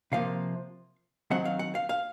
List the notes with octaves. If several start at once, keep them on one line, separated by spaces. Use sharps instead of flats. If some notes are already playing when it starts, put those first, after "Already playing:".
C3 F3 A#3 F5
D#3 F#3 C4 F#5
F5
F#5
F5
F5